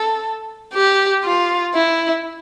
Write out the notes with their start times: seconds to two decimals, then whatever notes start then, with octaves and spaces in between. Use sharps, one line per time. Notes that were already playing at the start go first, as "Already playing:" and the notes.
Already playing: A4
0.73 G4
1.24 F4
1.74 E4